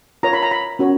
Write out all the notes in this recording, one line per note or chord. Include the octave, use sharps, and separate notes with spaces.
F4 A#4 C#5 A#5
B5
A#5
B5
C#4 F#4 A#4 C#5